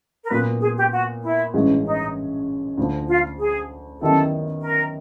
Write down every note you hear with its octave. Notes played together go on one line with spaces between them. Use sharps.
A#4
A#2 F#3 B3 B4
G#4
G4
F#4
E4
A1 G2 E3 G#3 C#4
D#4
D2 D3 F3
F4
G#4
F#2 D#3 G3 B3 E4 A4
A#4